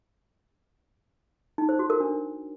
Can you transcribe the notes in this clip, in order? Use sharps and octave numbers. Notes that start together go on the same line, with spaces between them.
D#4
C5
F#4
A#4
D4